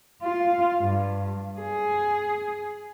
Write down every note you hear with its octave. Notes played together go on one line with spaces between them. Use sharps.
F4
G2
G#4